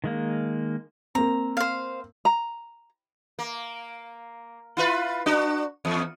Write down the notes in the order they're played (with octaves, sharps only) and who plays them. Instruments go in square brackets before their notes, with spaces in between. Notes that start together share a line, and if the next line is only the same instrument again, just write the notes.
[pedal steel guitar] D#3 G#3 A#3
[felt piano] A#3 C4 [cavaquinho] A#5
[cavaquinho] C5 F5
[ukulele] A#5
[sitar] A#3
E4 F4 B4
D4 F#4
E2